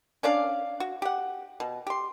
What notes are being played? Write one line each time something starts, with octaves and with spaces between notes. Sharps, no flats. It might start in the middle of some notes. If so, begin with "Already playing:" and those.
C#4 D4 D5 F5
F#4
G4 F#5
B2
G4 C6